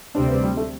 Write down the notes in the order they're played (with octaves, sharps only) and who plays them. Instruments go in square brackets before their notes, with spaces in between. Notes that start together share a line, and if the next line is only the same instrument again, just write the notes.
[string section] D2 C3 G3 C4 [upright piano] D4
[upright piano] B3
G3
A3